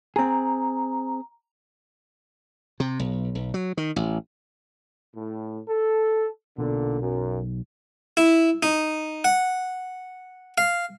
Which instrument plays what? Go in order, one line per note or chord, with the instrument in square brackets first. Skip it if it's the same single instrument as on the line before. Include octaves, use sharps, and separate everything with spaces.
[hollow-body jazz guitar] C4 G#4 [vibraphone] A#5
[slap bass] C3
B1
B1
F#3
D#3
A1
[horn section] A2
A4
[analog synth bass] B1 [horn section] A#2 D3
[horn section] F#2
[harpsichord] E4
D#4
F#5
F5